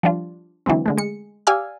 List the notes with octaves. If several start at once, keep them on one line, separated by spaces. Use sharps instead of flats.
F3 G3 D4 F4
D3 E3 F#3 G#3 C4
D3 G#3 A3
G#3 C#7
G4 D5 F5 G#5 E6 F6